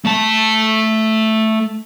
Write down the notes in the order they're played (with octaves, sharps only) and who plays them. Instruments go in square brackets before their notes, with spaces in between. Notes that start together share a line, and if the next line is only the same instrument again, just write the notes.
[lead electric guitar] A3 A5